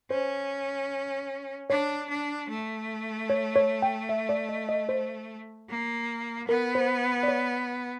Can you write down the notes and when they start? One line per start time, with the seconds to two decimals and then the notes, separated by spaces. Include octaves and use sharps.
0.10 C#4 C5
1.70 D4 C#5
2.10 D4
2.49 A3
3.30 C#5
3.56 C#5
3.82 G5
4.09 E5
4.29 D5
4.49 D#5
4.69 D#5
4.89 C5
5.69 A#3
6.48 B3 A#4
6.75 C5
7.23 D5
7.28 C#5